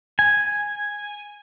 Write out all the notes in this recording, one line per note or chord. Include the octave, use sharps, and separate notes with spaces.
G#5